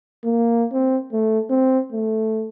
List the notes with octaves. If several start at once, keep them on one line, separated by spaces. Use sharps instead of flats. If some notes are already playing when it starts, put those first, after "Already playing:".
A#3
C4
A3
C4
A3